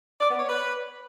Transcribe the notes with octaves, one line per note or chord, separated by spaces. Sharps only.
D5
B3
C#5
B4